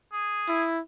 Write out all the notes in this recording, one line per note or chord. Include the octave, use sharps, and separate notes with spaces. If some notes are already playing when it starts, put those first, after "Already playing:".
G#4
E4